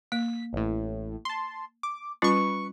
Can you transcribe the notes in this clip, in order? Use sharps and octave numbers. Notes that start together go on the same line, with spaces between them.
A#3 B6
A1 A2
A5 C6
D6
G3 C#4 F4 B4 C#6